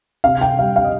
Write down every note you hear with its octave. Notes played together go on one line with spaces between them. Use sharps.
C3 F5
G5
G3 F5
F5
D#5